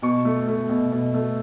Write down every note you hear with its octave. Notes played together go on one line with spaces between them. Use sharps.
B2 C#6
A3
A3
B2
B2
A3